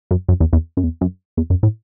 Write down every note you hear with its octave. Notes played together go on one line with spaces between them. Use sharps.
F#2
F#2
E2
E2
F#2
E2
F#2
E2
F#2
A2